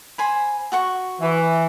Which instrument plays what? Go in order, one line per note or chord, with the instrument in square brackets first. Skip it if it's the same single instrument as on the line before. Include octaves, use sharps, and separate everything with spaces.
[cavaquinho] C5 G#5 B5
F#4 F#5 C#6
[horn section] E3